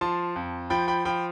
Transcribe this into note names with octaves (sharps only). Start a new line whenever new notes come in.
F3 A5 C6
F2
F3 G5 B5
G5 B5
F3 G5 B5